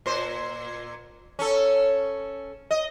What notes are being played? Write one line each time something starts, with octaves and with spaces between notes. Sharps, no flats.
A#2 C5
C#4 A4
D#5